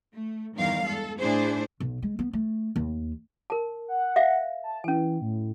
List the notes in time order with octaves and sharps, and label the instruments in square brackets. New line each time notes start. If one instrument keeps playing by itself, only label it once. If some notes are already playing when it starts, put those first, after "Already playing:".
[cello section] A3
E2 G2 D#3 A#4 F5
G#3 A4
A2 D4 E4 G#4 C5
[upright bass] B1
G#3
B3
A3
D#2
[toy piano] A#4 A5
[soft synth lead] F#5
[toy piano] E5 F5
[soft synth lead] A5
[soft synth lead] E3 [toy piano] C#4 G#5
[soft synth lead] A2